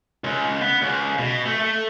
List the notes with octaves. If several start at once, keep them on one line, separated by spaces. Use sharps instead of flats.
C#2
B3
C#2
B2
A3
A3